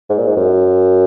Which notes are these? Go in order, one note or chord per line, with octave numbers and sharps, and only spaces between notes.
G#2
A#2
G#2
F#2